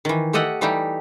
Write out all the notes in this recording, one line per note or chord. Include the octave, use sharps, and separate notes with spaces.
D#3 E3
A3 G4 A4 D#5 F#5
E3 G3 A3 D#4 G4